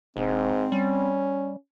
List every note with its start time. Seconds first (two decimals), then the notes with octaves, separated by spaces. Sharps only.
0.17 E1 G#2 C4
0.72 G3 C#4